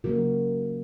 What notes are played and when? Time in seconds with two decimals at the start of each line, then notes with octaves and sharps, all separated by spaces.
0.04 C#3 F#3 A#3 F#4 A#4